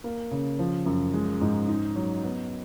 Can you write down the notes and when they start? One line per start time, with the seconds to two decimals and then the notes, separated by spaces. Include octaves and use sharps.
0.04 A#3
0.31 C#3
0.59 F3
0.86 F#2
1.14 G#3
1.41 G#2
1.68 D#4
1.96 F#3
2.23 B3